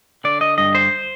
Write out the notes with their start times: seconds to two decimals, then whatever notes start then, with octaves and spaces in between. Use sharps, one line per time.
0.24 D3 D5
0.41 D#5
0.58 G2 D#5
0.75 C5